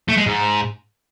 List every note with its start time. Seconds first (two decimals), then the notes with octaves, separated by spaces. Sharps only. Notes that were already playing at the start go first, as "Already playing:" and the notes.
0.08 A3
0.17 G#3
0.26 G#2